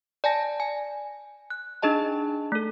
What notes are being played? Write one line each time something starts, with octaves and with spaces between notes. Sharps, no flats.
D5 G#5 A5 A#6
G#5
F#6
D4 D#4 G#4 D#5 A5
A3 A4